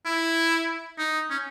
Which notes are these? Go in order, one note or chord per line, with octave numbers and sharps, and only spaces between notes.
E4
D#4
C#4